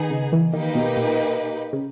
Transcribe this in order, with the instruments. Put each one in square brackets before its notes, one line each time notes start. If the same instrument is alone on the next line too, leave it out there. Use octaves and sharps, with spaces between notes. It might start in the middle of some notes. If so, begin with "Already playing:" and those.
Already playing: [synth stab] D#3 [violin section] B3 D#4 G#4
[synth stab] C#3
E3
[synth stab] D#3 [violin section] A#3 D#4 G4 B4
[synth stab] B2
A#2
C#3